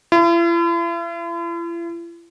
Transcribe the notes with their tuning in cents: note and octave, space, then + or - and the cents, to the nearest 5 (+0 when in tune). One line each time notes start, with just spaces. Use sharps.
E4 +45